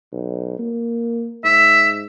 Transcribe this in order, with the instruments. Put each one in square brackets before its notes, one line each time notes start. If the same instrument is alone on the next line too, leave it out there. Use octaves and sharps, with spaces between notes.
[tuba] B1
A#3
[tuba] G#2 [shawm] E5